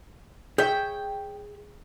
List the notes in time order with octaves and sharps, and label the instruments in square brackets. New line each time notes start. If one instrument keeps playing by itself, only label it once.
[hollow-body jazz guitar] G#4 C#5 E5 [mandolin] G5